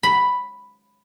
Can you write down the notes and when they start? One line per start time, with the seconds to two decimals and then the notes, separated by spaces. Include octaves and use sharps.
0.03 B5